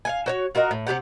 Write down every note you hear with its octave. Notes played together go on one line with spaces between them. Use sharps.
F5 F#5 G#5
F#4 C5 C#5
F4 F#4 A#4 D#5
A2
C3 F4 G4 F#5